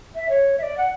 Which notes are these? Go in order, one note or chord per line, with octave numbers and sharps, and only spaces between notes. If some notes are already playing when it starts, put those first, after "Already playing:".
E5
C#5
E5
D5
F#5